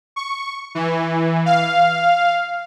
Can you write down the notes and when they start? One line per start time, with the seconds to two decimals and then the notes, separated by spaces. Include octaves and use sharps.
0.16 C#6
0.75 E3
1.46 F5